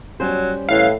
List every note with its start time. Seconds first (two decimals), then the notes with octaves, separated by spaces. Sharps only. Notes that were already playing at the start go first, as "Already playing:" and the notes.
0.20 F#3 G3 C#4 C5
0.69 A2 E3 F5